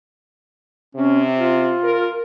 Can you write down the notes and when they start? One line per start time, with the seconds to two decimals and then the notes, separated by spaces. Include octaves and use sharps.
0.95 C3 C#4
1.37 F4
1.83 A#4